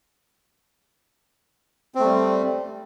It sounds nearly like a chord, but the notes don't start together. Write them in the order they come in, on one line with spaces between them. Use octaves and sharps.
C4 A3 G3